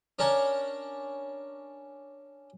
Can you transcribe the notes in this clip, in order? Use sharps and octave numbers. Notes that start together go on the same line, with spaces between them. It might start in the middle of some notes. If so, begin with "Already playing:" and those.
C#4 D4 A#4 C#5